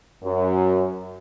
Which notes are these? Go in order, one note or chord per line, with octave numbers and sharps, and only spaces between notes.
F#2